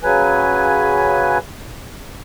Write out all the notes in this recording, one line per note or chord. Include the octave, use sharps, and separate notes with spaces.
C#3 F#3 B4 G#5